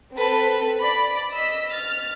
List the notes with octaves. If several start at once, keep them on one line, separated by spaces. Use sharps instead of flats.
C4 A4 B4
D5 B5
D#5 E6 B6
F6 A6